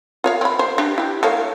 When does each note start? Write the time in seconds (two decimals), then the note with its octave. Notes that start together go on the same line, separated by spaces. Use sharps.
0.24 F4 C#5 F5
0.41 C4 B5
0.59 C5
0.78 D4 G4
0.98 E4 G4
1.23 A3 A#3 C#5